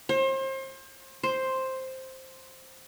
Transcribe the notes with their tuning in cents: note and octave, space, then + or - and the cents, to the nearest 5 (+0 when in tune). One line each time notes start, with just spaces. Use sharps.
C5 +35
C5 +5